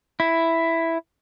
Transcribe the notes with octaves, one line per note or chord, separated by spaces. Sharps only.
E4